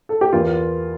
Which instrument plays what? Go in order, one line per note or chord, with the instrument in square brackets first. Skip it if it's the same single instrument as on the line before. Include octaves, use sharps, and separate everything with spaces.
[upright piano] A4
G4
E2 E3 A#3 F4